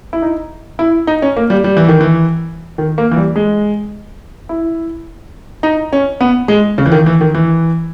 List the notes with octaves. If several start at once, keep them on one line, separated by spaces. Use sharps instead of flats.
E4
D#4
E4
D#4
C#4
A#3
G3
G3
E3
D#3
E3
D#3
A#3
E3
G3
G#3
E4
D#4
C#4
B3
G#3
C#3
E3
D#3
E3
D#3
E3